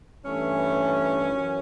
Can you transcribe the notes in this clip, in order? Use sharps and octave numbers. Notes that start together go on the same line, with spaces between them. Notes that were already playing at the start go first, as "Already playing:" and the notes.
G2 E3 A3 C#4
F#2 E3